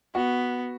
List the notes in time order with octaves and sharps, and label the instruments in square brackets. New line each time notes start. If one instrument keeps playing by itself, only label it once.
[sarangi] B3 [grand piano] F#4